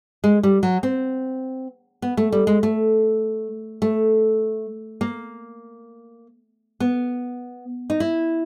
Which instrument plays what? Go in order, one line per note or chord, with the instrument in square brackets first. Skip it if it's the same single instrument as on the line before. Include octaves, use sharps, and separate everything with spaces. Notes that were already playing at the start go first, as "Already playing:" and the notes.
[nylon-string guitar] G#3
G3
F#3
C4
B3
A3
G3
G#3
A3
A3
A#3
B3
D#4
E4